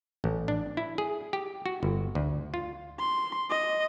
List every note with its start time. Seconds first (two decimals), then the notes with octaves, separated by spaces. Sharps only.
0.24 A1
0.48 D4
0.77 E4
0.98 G#4
1.33 G4
1.66 F#4
1.83 G1
2.15 D2
2.54 F4
3.00 C6
3.50 D#5